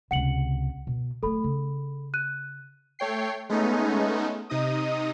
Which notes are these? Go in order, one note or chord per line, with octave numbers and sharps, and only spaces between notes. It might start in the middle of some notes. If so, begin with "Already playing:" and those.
C#2 C3 F#5 C#7 F#7
B2
F#3 A3 A4 B5
C#3
F#6 D#7
A3 C#5 G5 C7
G#3 A3 B3 C#4 D#4
C3 D#4 D#5 D#6